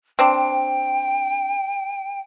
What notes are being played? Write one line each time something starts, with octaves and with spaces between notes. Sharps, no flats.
C4 D4 G5